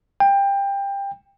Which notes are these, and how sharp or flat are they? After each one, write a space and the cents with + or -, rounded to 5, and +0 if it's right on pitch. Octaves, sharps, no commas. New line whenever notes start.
G5 +20